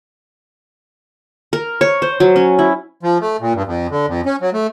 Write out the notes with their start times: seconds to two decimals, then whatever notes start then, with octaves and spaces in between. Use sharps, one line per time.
1.53 A#4
1.81 C#5
2.02 C5
2.20 F#3
2.36 C#4
2.59 E4
3.03 F3
3.21 A3
3.40 A#2
3.54 G2
3.66 F2
3.90 D3
4.08 F2
4.26 C#4
4.41 F#3
4.53 A3